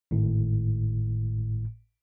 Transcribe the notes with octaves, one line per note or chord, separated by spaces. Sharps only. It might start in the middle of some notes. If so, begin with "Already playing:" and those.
G#1 A2